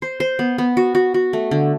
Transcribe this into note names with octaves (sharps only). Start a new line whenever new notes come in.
C5
C5
B3
B3
F#4
F#4
F#4
A3
D3